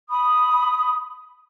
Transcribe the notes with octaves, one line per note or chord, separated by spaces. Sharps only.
B5 D#6